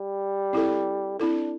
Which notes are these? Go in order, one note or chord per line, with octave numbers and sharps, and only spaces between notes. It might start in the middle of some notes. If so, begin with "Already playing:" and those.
Already playing: G3
C4 E4 A4
C4 D4 E4 A4